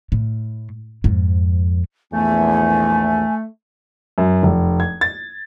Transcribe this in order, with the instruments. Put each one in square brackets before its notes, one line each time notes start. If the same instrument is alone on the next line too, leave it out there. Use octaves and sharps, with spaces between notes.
[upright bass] A2
F2 G#2
[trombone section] A#1 E2 [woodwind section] A3 [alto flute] G#5
[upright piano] F#2
F1
G#6
A6